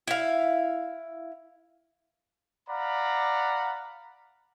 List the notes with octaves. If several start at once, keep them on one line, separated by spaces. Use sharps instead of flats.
E4 F5
D5 F5 F#5 A#5 B5